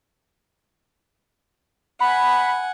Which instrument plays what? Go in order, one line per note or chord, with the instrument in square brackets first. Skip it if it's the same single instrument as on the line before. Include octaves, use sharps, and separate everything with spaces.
[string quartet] F#5 G#5 [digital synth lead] B5